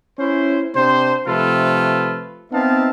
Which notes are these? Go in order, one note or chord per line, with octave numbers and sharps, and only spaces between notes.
C#4 E4 C5
C3 C4 D4 C5
C3 F3 A3 F4 A4 B4
B3 C4 D#4 E5 F5 A5